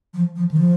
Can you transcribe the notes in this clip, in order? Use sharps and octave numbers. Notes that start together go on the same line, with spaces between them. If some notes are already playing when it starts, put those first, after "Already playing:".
F3
F3
D#3
F3